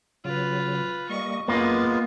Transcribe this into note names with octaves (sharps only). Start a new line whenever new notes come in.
C#3 F#3 F4 B4
G3 A#3 D#5 C#6
F#2 G#3 A#3 B3 F4 G#4 B4 A6